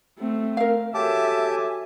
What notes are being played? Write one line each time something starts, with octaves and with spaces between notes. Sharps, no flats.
A3 C4
A#4 F5
F#4 G4 A4 C#5 E5 G#5 A5 D6